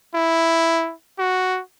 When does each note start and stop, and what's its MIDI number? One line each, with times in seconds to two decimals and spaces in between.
0.14 0.93 64
1.18 1.60 66